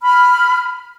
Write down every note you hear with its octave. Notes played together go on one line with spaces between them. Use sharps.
B5 F6